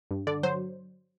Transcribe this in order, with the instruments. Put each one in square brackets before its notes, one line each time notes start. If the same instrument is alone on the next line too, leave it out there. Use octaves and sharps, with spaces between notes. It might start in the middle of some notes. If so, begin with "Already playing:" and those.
[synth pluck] G2
D3 D5
F#3 C5